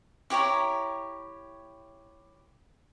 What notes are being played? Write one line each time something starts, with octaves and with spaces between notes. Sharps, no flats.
E4 G4 C#5 A#5